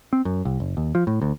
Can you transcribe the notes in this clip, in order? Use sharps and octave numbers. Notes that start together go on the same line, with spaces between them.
C4
F#2
C2
F#1
D#2
F3
A2
D2